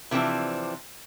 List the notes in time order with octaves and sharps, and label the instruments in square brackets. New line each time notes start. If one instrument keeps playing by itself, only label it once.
[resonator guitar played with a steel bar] C3 E3 F3 C4 D4